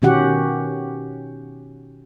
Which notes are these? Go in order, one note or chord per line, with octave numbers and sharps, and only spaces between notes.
B2 D#3 C#4 F#4 G4 F#5